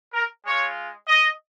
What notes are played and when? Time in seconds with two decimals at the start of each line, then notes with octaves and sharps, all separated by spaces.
0.13 A#4
0.44 G#3 F4 C#5
1.07 D#5